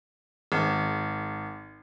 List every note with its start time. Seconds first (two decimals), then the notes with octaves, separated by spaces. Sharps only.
0.52 G#1